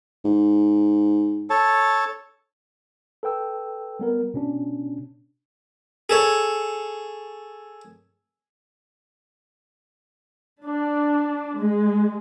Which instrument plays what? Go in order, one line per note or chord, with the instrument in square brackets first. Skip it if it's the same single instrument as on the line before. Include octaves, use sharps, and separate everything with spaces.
[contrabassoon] G#2
[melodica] A4 C#5 A5
[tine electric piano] A4 B4 G5 E6
G3 B3 A#4
B2 C#4 D4
[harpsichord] G#4 A4 C#5
[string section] D4
G#3